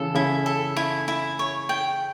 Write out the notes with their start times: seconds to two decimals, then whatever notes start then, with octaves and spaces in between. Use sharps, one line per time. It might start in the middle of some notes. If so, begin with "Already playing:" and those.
Already playing: C#3 E3 A4
0.14 C#3 E4
0.46 A4
0.77 E4
1.08 E4
1.39 C#5
1.69 G5